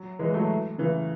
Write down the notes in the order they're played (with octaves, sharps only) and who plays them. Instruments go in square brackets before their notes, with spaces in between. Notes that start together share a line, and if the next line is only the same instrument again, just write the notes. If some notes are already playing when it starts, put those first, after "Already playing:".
Already playing: [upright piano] F#3
E3 G#3
F#3 A3
C#3 E3